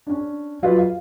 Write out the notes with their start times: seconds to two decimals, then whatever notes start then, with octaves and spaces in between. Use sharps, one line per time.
0.07 C#4 D4
0.63 F#3 F4 G4 B4
0.79 F5